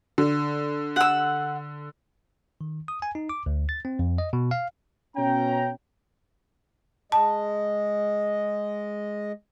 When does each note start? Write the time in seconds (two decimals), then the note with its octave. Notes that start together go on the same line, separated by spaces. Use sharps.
0.18 D3
0.96 F#5 E6
2.61 D#3
2.88 D#6
3.02 G#5
3.15 D#4
3.29 D6
3.46 D2
3.69 A6
3.85 C4
3.99 F2
4.18 D#5
4.33 B2
4.51 F5
5.16 B2 C#4 G5 A#5
7.12 G#3 D#5 A5